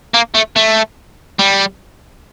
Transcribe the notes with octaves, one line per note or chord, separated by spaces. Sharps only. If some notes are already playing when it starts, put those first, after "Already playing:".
A#3
A3
A3
G3